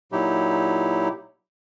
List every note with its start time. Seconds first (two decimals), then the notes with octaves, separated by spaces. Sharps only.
0.12 A#2 F#3 D#4 E4 G4